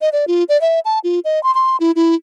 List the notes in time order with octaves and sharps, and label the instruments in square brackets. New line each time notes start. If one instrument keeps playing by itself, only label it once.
[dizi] D#5
D5
F4
D5
E5
A5
F4
D#5
C6
C6
E4
E4